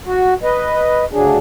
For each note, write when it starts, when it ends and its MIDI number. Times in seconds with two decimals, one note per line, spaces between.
0.06 0.34 66
0.43 1.05 71
0.43 1.05 75
1.12 1.38 38
1.12 1.38 49
1.12 1.38 54
1.12 1.38 62
1.12 1.38 68